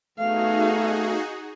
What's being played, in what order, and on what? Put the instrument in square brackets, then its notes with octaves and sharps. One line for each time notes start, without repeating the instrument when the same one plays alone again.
[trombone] A3 [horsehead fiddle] B3 F5 [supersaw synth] D#4 F#4 G#4